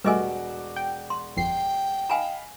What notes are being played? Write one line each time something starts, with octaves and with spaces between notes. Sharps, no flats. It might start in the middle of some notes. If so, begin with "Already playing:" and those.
E1 G3 A3 F#4 B4 D#5 G#5 D6
G5
C6
G1 F2 G5 C7
D#5 F5 G#5 A#5 B5